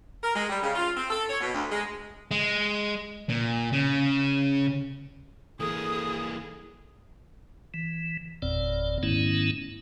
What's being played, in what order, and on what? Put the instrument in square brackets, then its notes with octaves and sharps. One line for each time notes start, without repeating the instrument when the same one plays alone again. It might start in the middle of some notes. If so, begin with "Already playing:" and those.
[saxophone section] A#4
G#3
G3
C#3
F4
C4
A4
C#5
B2
D2
G#3
[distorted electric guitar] G#3
A#2
C#3
[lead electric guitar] E3 A#3 [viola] G#4 [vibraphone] A4 [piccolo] D#6
[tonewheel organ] E3
F#1 E2 A#2 C4 D5
G#2 D#3 A3 B3 C#4 E4